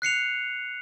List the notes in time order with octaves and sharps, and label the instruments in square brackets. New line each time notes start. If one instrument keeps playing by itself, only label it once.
[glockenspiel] F#6 C7 C#7 F7